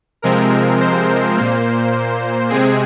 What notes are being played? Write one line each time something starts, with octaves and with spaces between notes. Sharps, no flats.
C3 F3 G#3 C4 A#4
C5
A#2 A#3
C3 G#3 C4 G#4